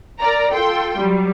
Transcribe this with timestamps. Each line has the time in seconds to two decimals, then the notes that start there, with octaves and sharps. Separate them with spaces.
0.20 A#4 D5 A#5
0.53 F4 A4 G5 C6
0.98 F#3 G3